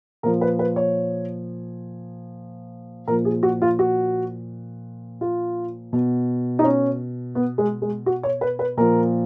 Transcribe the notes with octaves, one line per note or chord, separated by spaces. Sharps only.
A#2 F3 A#4
B4
B4
C#5
A#2 F3 A#4
G#4
F#4
F4
F#4
F4
B2
D#4
C#4
B3
G#3
G#3
F#4
C#5
B4
B4
A#2 F3 A#4